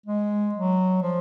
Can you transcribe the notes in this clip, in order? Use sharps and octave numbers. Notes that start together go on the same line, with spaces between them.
G#3
F#3
F3